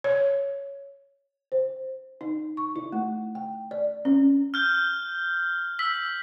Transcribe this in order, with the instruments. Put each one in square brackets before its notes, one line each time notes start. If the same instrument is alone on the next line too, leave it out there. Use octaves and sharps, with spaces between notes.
[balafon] C#5
C5
D#4
C#6
E4
A3
G5
D5
C#4
[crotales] F6 G6 G7
E6 F6 B6 F#7